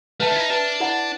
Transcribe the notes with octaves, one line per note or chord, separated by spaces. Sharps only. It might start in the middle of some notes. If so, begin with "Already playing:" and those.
A3 B4 E5 A5
D4
E4
D#4
D4 B4 E5 A5
E4 A4 D5 F#5 B5